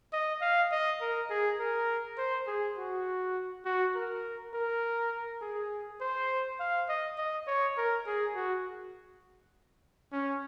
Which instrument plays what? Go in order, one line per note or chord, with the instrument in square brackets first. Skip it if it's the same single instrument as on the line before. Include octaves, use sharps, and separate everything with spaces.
[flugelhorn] D#5
F5
D#5
A#4
G#4
A#4
C5
G#4
F#4
F#4
A#4
A#4
G#4
C5
F5
D#5
D#5
C#5
A#4
G#4
F#4
C#4